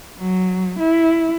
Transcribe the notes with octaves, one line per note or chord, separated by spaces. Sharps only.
F#3
E4